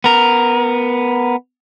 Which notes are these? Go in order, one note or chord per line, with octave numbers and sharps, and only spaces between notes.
B3 A#4